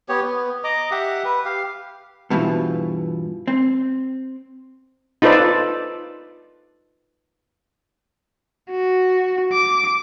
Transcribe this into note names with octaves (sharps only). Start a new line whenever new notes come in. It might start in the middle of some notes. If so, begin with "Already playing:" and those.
B3 G4 C#5
B3
D#5 A#5 D6
G4 E5 F#5
B4
G4 F5
G2 B2 E3 F3
C4
D#4 F4 A4 B4 C5 D5
F#4
D6